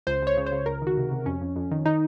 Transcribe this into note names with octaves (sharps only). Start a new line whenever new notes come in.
C#2 C5
C#2 C#5
C#3
C5
C#3
C#2 A#4
D#3 F#4
C3
C3
F2 C#4
F2
F2
D#3
D#3 D#4